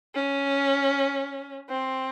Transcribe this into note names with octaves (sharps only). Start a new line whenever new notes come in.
C#4
C4